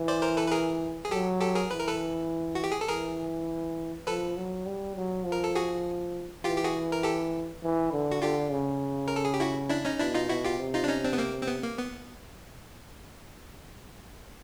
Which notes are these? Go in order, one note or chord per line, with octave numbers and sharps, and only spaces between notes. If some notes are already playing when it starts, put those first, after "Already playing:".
Already playing: E3
C5 D5
A#4 C5
A4 B4
B4
G#4 A#4
G#4
F#3 G4 A4
G4 A4
G#4 A#4
E3 B4
A#4
A4 B4
F#4
G4
G#4
A4
E3 G#4 A#4
F3 A4 B4
F#3
G3
F#3
F3
A#4
A4
F#4 G#4
E3 F4 G4
G4
F#4 G#4
A#4
G4 A4
E3
D3
F#4
D3 F4 G4
C#3
A#4
A4
G#4
G4
E4 F#4
D4 E4
C#4 D#4
B2 D4 E4
D#4 F4
B2 E4 F#4
F4 G4
C3
D#4 F4
D4
C#4 D#4
C4 D4
B3
A#3 C4
C4
B3
A#3
B3